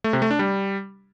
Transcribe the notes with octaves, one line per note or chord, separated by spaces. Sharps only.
A3
C3
A3
D4
G3